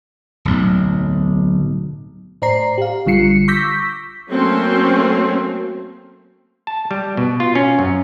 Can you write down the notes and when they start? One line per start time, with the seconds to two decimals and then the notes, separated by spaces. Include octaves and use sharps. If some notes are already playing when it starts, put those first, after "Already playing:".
0.45 D1 B1
2.42 A2 C5 D5 A#5 C7
2.78 G4 F5
3.06 A#1 D3 G3 F4 C7 C#7
3.48 C#6 D6 E6 G6 A#6 B6
4.30 F#3 A3 A#3 C4 C#4
6.67 A5
6.91 G3
7.17 B2
7.40 F4
7.55 C#4
7.79 F#2